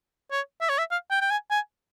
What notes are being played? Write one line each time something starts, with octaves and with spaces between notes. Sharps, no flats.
C#5
E5
C#5
E5
F5
G5
G5
G#5
G#5